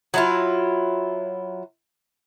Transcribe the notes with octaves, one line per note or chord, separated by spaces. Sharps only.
F#3 E4 F4